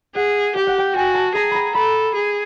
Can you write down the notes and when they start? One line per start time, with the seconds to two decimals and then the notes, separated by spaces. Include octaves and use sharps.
0.15 G#4 F#5
0.55 G4 G5
0.67 F#5
0.78 G5
0.95 F#4 G#5
1.15 A5
1.35 G#4 A#5
1.51 A#5 B5
1.75 A4 B5
2.15 G#4